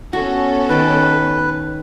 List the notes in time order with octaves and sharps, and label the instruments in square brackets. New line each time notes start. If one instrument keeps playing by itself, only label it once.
[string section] B3 C#4 A4 [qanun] F#4
[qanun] D#3 A5 D6 [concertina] B4